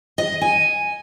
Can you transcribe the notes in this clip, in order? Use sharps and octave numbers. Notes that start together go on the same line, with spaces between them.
D#5
G#5